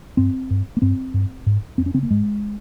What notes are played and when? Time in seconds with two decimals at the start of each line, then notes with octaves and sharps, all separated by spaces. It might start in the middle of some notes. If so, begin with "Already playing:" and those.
0.17 G2 C4
0.50 G2
0.77 A#3
0.82 G2 C4
1.14 G2
1.46 G#2
1.78 F2 C4
1.86 C#4
1.94 C#3 C4
2.03 A#3
2.11 G#2 G#3